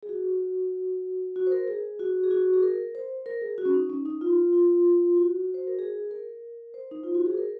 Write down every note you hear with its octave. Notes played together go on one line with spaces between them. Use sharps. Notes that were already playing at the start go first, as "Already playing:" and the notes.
G#4
F#4
F#4
C5
A#4
G#4
F#4
G#4
F#4
G#4
A#4
C5
A#4
G#4
F#4
C#4
D#4
C#4
D#4
F4
F4
F#4
C5
A#4
G#4
A#4
C5
D#4
F4
F#4
G#4
A#4